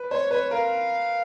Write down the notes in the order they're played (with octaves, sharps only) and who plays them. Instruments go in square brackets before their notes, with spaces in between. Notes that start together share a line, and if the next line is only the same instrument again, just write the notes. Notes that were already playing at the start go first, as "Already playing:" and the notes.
Already playing: [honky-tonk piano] B4
[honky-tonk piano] C5 [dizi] C#5
[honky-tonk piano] B4 [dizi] C#5
[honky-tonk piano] A#4 [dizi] F5